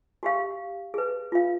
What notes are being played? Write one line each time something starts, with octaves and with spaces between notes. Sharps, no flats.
F#4 G4 F5
G#4 B4
F4 F5